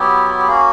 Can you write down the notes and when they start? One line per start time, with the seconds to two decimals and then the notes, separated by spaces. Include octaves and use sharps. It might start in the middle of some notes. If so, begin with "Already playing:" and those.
Already playing: F#3 B3 E4 G4
0.38 G4
0.47 A#3 C#4 F#4 G#4